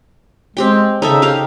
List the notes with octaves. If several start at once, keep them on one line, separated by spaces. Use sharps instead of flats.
G#3 C4 G4 G5
C#3 D#4 A4 E5
D#4 G4 F5